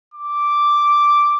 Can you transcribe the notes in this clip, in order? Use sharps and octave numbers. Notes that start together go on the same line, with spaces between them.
D6